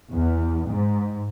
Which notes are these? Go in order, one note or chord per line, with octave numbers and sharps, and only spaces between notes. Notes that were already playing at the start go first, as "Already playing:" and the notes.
E2
G#2